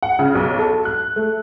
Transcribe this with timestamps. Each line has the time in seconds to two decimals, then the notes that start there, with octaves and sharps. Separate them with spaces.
0.03 F#5
0.19 C#3
0.35 B1
0.59 A4
0.85 F#6
1.16 A3